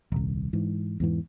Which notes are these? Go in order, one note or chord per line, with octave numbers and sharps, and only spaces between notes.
D#1 C2
G#2 E3
E2 G#2 E3